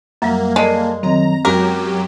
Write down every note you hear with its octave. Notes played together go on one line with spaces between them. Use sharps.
F#2 F#3 G3 A#3 E5 F#5 A#5
G#3 A#3 A4 A#4 D5 G#5 A5
D#3 F#3 C4 D#5 A#5
F#2 F#3 G#3 C#4 F#4 G4 A#4 D6